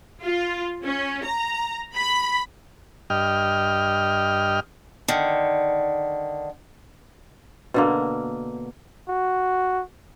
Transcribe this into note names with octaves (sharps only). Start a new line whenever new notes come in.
F4
C#4
A#5
B5
G2 D#5 G5 F6
D3 D#3
B2 D3 A#3
F#4